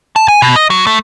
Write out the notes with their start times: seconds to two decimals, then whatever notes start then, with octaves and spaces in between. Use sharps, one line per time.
0.16 A5
0.28 G#5
0.42 B2
0.56 D#5
0.70 F#3
0.87 A3